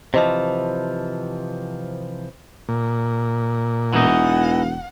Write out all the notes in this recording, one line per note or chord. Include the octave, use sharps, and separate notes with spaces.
C3 E3 F3 C5 D#5 A5
A#2
E1 E3 D#4 F#5